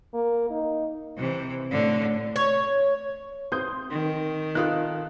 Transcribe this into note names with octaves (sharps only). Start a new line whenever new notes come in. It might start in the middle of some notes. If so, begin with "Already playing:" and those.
A#3
D#4
C3 E3
A2 D3
C#5
C4 C6 D#6 G6
D#3
D#4 F4 A4 D#6 F#6